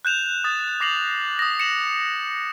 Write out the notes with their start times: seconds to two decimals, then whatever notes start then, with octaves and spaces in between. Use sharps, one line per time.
0.05 F#6 G6 E7 F7
0.44 D#6 A6
0.80 D6 A#6 C7 F7 F#7
1.39 D#6 A#6
1.60 C#7 E7 F#7